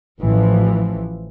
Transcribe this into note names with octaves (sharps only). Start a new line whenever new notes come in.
A1 E3 F3